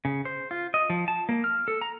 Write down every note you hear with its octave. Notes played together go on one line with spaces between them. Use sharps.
C#3
C5
F4
D#5
F3
A5
A#3
F6
A4
A#5